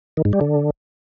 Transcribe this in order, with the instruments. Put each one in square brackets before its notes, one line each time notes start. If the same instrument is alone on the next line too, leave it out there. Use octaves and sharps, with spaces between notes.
[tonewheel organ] D#3
G#2
G3
D3